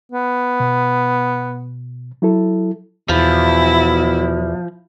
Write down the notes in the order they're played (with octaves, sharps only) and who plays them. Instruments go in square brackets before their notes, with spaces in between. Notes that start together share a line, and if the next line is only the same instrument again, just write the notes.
[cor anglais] B3
[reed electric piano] B2
F#3 E4 A4
[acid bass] E2 [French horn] B2 [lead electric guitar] F3 [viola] E4